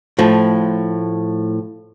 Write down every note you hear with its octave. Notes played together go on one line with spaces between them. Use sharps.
A2 F3